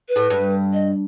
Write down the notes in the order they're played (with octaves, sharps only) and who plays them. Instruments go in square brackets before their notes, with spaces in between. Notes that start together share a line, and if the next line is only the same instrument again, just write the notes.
[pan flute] B4
[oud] A2
G2
[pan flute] D#5